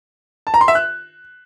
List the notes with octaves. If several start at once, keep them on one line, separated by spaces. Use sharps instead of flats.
A5
A#5
C6
E5
F#6